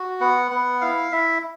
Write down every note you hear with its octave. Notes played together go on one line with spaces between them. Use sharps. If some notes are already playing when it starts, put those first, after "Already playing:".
Already playing: F#4
B3 F#5
B3 F#5
E4 F5
E4 E5